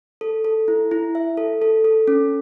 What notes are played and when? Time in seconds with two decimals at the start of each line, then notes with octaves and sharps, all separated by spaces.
0.21 A4
0.45 A4
0.68 E4
0.91 E4
1.15 E5
1.37 A4
1.62 A4
1.84 A4
2.08 C#4